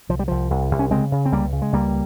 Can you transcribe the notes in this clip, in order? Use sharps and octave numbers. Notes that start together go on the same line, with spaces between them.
C2 F3
G3
C2 F3
C2
C2
C#4
C#3 G#3 C4
C#3
C4
C#2 G3 A#3
C#3
G#3
C#2 G3 A#3